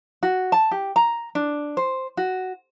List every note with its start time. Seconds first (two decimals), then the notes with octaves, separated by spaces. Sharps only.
0.23 F#4
0.52 A5
0.71 G4
0.96 A#5
1.35 D4
1.77 C5
2.17 F#4